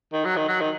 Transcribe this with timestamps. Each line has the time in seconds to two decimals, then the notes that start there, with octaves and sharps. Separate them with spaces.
0.13 D#3
0.24 F#3
0.37 D#3
0.48 F#3
0.60 D#3